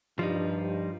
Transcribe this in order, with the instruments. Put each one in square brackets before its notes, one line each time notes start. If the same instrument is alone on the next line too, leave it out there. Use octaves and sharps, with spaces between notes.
[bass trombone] G2 [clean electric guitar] F3 G3 D#4